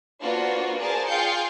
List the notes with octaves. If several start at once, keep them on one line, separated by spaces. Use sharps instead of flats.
A#3 B3 D4 F4 F#4 C5
G#4 A#4 C5 D5 G#5 A5
F4 G#4 F5 G5 G6 C#7